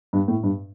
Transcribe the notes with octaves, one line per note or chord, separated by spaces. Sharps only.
G2
A2
G2